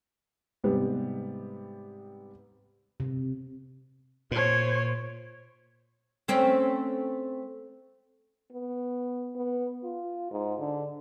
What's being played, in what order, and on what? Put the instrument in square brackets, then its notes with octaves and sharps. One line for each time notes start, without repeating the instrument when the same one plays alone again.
[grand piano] G#2 C3 G3 B3
[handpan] C3
[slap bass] A#2 [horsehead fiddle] C5 C#5
[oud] A3 C4 C#4
[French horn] B3
B3
F4
G#2
D3